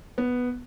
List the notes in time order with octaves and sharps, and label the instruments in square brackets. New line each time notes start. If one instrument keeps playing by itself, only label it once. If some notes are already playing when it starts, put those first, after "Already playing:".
[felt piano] B3